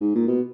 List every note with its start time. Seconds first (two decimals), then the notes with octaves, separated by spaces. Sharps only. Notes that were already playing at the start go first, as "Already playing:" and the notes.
0.01 G#2
0.15 A#2
0.27 B2